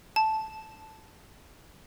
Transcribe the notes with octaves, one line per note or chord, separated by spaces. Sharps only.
A5